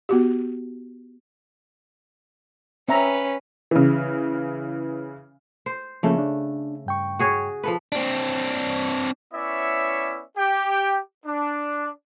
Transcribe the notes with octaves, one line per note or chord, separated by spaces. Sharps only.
B3 F#4 G4
C4 C#4 B4 E5 A#5
C#3 E3
C5
C#3 F3 A3 A#3 C#4
D4
G2 G5 C#6
F#4 G#4 C#5
F3 A4 B4
C4 D4
B3 C#4 E4 C#5 D5 E5
G4 G5
D4